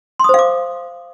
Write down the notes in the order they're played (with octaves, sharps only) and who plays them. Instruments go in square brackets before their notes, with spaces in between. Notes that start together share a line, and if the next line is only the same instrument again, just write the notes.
[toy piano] C6
D#6
C5
F5
D6